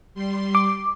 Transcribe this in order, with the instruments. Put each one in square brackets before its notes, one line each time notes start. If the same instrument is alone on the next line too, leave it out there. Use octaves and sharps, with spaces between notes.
[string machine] G3 C6
[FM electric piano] D6